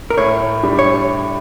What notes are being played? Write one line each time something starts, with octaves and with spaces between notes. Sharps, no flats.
A#4
A2 C#5
G3 D4
C#5